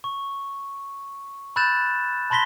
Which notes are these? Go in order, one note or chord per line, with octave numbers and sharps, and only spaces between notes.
C#6
B5 E6 F#6 G6 A6 E7
A5 B5 C6 A#6 B6 G7